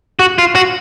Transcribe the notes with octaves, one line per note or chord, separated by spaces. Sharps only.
F#4
F4
F#4